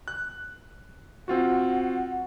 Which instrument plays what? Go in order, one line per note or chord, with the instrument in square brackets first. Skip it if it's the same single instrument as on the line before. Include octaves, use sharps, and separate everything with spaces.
[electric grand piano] F#6
[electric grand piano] C4 F4 F#4 [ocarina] F#5